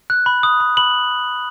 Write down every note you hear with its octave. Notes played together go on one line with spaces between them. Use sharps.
F#6
B5
D#6
B5
B5 F#7